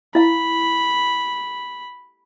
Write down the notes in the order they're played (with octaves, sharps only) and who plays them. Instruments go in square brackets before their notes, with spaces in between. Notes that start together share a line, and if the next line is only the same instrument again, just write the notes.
[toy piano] E4 F5 [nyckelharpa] B5